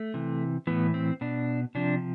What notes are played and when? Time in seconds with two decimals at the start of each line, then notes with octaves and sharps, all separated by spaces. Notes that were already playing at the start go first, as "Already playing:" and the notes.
Already playing: A3
0.14 C3 E3
0.67 A2 E3 B3
0.94 C4
1.21 B2 D4
1.75 C3 F3 D4